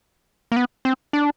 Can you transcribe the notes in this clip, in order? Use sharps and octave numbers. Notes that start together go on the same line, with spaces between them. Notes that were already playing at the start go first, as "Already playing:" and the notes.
A#3
B3
C4
D4